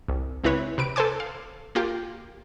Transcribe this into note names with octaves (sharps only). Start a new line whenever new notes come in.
C2
C#2 C4 E4 B4 C#5
C3 B4 D7
A4 B4 C5 G#5 D6
F5
A#3 F4 G4